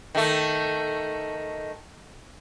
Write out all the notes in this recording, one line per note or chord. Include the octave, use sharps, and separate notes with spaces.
D#3 A3